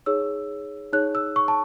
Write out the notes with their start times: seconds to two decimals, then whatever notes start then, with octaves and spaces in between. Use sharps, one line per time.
0.06 D#4 G#4 C#5 E6
0.93 D#4 G#4 C#5 F#6
1.15 E6
1.36 C#6
1.48 A5